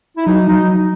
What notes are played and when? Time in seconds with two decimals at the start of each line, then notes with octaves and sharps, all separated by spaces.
0.17 E4
0.26 F#3 D#4
0.47 F#3 D#4